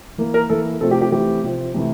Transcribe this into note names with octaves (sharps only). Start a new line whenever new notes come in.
E3 A#3
A#4
E3 A#3 A4
C3 F3 A3 C4 A4
G4
G4
E3 A3 C4 G4
C3 F3 C4
C3 E3 A3